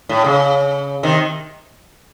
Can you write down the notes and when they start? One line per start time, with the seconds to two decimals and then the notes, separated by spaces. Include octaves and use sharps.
0.09 A2
0.25 C#3
1.03 C3 D#3